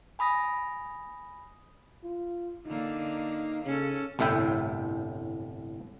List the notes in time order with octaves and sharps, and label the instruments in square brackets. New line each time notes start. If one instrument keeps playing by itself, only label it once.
[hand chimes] G#5 B5 D#6 A#6
[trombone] F4
[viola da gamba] D3 A#3 [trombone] D#4
[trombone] C#3 [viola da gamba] C#4 A4
[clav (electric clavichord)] G1 C2 A2 E5 G5